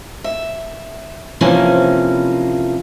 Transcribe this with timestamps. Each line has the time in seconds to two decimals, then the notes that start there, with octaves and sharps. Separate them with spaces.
0.24 E5
1.41 C3 E3 F3 A#3 C#4